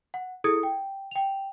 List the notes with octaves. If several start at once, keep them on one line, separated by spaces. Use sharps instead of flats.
F#5
E4 G#4 A4 D#6 G#6 C#7
G5
G5 F7